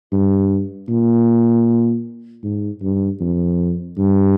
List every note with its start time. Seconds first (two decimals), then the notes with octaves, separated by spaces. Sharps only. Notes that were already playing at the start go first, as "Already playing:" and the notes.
0.12 G2
0.89 A#2
2.44 G#2
2.83 G2
3.21 F2
3.98 G2